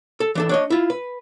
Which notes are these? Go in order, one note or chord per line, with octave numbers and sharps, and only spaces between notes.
A4
E3 D4 A4
D4 C#5 D#5
E4 F4
B4